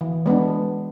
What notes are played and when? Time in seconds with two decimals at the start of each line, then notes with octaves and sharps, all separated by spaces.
0.01 E3
0.26 G#3 B3 D4